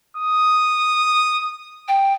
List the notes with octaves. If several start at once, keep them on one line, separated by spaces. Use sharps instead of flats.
D#6
G5